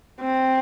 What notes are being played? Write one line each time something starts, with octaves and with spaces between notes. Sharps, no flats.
C4